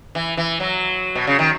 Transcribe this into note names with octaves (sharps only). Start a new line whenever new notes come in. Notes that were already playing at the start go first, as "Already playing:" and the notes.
E3
E3
F#3
B2
C#3
D#3